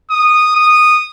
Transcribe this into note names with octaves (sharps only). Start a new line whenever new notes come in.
D#6
D#6